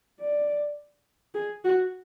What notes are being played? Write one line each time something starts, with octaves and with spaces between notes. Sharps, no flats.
D5
G#4
F#4